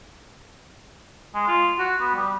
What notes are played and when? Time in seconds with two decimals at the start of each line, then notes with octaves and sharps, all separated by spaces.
1.35 G#3
1.48 F4
1.79 F#4
2.01 B3
2.15 G3